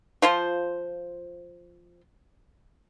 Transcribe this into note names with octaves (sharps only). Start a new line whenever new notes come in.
F3 F4 C5